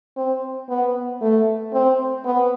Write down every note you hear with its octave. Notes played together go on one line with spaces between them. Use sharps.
C4
B3
A3
C4
B3